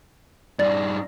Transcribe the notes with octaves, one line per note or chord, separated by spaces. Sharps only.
G2 D#4 D5 A6